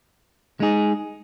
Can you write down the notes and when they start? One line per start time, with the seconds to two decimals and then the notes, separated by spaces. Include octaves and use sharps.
0.60 G#3 D#4 G#4